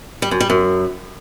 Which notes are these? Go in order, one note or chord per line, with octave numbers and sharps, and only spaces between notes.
G3
F#2
G3
F#2